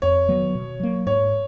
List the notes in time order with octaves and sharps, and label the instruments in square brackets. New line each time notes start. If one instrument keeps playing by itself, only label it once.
[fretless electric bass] F2 [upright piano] C#5
[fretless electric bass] D#3 F#3 B3
B2
F#3 A#3
[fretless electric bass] G#2 [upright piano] C#5